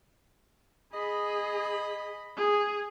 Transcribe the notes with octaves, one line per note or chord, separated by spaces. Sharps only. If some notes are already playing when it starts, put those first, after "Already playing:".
G#4 D#5 B5
G#4